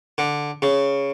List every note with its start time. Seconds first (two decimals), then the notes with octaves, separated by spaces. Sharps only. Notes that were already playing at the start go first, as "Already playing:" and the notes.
0.18 D3
0.62 C#3